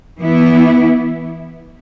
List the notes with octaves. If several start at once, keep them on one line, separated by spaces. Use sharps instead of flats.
E3 B3 E4